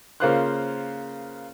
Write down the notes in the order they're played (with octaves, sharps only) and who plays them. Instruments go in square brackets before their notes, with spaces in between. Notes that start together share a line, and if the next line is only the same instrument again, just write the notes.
[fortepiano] C#3 A#3 F4 C5 F5 F#6